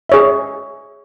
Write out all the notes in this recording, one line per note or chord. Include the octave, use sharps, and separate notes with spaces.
G#4 C#5 E5